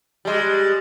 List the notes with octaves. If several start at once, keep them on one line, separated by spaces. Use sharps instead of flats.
G3 G#3